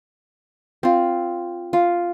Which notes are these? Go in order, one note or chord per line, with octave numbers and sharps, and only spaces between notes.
C4 F4
F4